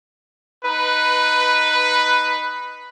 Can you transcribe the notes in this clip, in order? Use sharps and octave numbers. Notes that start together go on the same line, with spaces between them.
D#4 B4